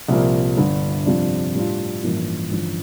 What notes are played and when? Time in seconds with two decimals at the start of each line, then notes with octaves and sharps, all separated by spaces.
0.08 C2 A#2 F3 A#3
0.57 G1 G2 D3
1.06 F2 C3 G3 D4 F4
1.54 A2 G3 D4 F4
2.03 A1 G2 F3 A#3 E4
2.51 A1 G2 D3 F3